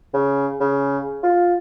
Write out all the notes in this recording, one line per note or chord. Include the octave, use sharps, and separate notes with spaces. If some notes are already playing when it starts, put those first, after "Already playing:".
C#3
C#3
F4